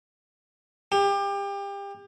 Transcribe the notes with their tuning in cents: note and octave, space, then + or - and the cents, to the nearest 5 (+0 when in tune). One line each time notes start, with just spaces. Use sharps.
G4 +30